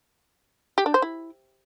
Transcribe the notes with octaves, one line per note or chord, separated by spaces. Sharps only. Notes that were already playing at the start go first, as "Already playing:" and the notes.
G4
D4
C5
E4